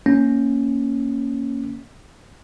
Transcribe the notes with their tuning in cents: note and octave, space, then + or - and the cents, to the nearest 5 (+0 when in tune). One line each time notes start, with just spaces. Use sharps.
A#3 +0 C#4 +0